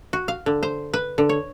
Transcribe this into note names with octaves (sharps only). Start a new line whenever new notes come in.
F#4
F5
D3
C5
B4
D3
C#5